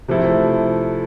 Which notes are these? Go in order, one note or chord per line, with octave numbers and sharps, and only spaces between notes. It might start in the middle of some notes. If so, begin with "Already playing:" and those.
C3 F3 A3 E4 A4